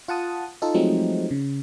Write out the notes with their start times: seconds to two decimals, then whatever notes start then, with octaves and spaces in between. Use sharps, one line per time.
0.08 F4 F#5 A5 D#6
0.62 D#4 F4 A4
0.75 F3 F#3 G#3 A3 C4 D#4
1.31 C#3